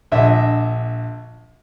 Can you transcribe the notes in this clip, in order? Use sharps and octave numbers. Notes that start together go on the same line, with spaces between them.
A#1 D3 D#5 E5